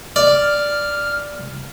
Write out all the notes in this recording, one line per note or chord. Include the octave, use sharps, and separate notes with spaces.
D5 F6